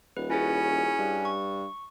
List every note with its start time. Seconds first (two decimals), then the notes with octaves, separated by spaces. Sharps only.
0.17 D#1 B4
0.30 C#4 E4 F#4 G#4
0.99 G2
1.25 C#6